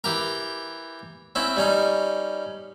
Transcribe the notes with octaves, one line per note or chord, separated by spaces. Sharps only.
E3 G4 A#4
C4 C#4 E4
G3 C#4 D#4